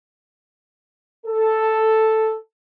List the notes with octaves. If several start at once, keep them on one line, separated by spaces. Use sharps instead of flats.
A4